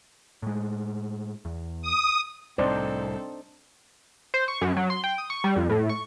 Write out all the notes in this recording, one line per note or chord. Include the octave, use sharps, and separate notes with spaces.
A2 G#3
E2
D#6
C2 A2 C3 C4 D4 D#4 A4 C5
C5
C#6
F#2
F#3
C6
G5
D#6
C#6
G3
F2
A2
C#6